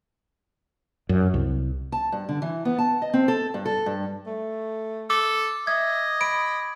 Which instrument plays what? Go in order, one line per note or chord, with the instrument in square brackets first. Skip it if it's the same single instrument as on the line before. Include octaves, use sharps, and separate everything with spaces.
[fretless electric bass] F#2
C2
[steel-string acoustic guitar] A5
G2
D3
E3
B3
A5
D#5
C4
A4
G2
A4
G2
[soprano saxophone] A3
[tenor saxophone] A4 [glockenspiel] D6
[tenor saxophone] D#5 [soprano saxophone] E5 [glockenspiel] G#6
[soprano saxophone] B5 [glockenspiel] D7